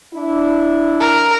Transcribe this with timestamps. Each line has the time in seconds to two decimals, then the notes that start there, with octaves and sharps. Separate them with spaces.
0.14 D4 E4
1.00 A#4